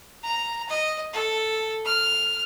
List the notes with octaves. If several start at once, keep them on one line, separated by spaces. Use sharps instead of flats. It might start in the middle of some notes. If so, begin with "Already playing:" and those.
A#5
D#5
A4
F6